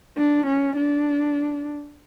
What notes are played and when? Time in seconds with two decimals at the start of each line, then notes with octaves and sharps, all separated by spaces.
0.17 D4
0.47 C#4
0.76 D4